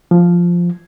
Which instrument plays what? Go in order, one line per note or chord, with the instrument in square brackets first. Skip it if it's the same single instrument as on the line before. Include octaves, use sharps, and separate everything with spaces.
[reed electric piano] F3